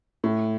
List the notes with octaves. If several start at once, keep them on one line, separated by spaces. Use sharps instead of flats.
A2